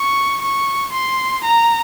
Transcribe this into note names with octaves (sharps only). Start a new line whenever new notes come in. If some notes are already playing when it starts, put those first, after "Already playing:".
Already playing: C#6
C#6
C6
A#5